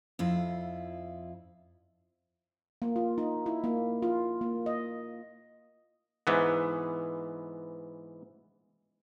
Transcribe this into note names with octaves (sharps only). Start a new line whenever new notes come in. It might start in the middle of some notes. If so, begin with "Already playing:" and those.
F2 E4 F4
A#3
F4
D#4
E4
A#3
F4
A#3
D#5
G#2 E3 B3